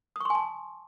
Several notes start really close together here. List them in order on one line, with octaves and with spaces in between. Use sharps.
D#6 C#6 C6 G#5 A5